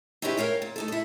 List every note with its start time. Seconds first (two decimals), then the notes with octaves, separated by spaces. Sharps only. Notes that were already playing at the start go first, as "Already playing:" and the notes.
0.22 C4 C#4 D#4 E4 G4 B4
0.37 A#4 C#5 F5 G5
0.62 A#2
0.76 A3 D#4 A4
0.88 E4 A4